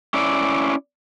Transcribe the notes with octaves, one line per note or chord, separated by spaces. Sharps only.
C#4 E4 D5